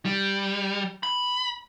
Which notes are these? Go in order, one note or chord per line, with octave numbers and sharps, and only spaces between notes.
G3
B5